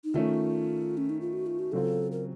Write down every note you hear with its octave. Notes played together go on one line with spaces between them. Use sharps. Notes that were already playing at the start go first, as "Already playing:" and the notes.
D#4
D#3 A3 C#4 F4
C#4
D#4
F4
F#4
F4
F#4
C#3 F#3 C4 F4 A4
A#4